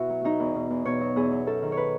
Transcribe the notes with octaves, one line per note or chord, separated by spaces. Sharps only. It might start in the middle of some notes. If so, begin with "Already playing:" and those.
Already playing: B2 E4 F#4
F#3
F#3 D#4
E2
B2
E2
B2 C#5
F#3
E2 G#4
F#3
F#2 A4
D#3
B4 C#5